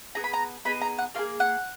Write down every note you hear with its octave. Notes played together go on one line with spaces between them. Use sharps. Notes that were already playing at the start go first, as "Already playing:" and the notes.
B3 D#4 G#4 A#5
B5
A#5
B3 D#4 G#4 B5
A#5
F#5
A#3 F4 G#4 F5
F#5